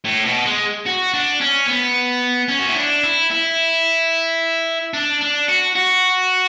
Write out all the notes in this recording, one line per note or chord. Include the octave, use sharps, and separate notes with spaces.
A2
B2
G#3
F#4
D4
C#4
B3
C#4
F#4
E4
D4
E4
E4
D4
D4
F#4
F#4